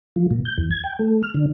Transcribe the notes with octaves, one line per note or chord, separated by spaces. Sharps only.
F3
A#2
G6
E2
G#6
G5
A3
F6
D3